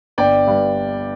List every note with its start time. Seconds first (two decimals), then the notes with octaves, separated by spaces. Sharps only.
0.18 G1 D5 G5
0.47 G2